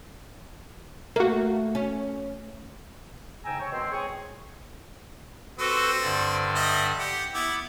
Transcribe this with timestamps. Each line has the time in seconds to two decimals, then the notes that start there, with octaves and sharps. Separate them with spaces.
1.16 A3 A#3 F#4
1.75 C#4
3.45 G#2 C#3 G5 G#5 A#5 E6
3.60 C#5
3.72 B2 D#3 G#3 C4
3.91 C4 G#4 C#5
5.59 C4 F#4 G4 A4 B4
6.01 G2 D3 D5
6.55 G3 D#5 E5
6.99 G4 F#5
7.34 B3 E4 D6